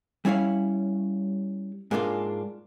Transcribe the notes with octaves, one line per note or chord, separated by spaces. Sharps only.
G3 C#4 E4 C#5 F5
G#2 G#3 A#3 D4 F4